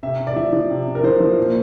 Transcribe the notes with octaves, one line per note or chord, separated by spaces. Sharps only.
C3 E5
C3
D5
F3 E5
F3
C3
C3
A#4
F3 C5
F3
A#2